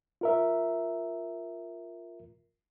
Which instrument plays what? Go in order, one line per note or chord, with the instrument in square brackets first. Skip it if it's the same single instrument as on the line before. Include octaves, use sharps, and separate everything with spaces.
[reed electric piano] F4 A#4 E5